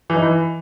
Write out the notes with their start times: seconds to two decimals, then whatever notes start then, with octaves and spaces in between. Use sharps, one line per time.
0.10 E3
0.16 D#4
0.22 E3